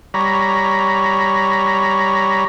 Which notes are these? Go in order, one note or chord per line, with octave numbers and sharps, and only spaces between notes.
G3 C#5 A#5 B5